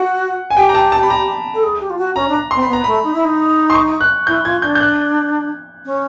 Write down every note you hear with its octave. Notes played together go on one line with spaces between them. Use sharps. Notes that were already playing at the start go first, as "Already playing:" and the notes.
Already playing: F#4 F#5
G#5
G4 G5
A#5
A5
A5
B5
A#5
A4
G#4
G4
F4
F#4
C#4 A#5
D4
A#5
C4 C6
B5
B3 A#5
A3 B5
D#4
E4
D#4
C6
C#6
F#6
E4 G6
F4 G#6
D4 G6
G6
F#6
C#4